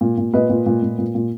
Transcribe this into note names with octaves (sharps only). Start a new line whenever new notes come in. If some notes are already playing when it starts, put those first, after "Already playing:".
A#2
A#2
A#2 B4 D#5
A#2
A#2
A#2
A#2
A#2